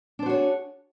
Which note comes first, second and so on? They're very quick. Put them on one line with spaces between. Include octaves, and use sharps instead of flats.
D4 C5 F#4 C#5 G#4